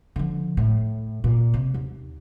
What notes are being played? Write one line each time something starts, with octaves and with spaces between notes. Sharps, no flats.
D3 F3
A2
A#2
C3
D#2